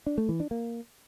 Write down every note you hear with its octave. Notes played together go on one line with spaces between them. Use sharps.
D4
A3
E3
D4
A#3